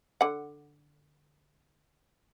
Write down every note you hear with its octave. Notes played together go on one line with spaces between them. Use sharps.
D3 F#5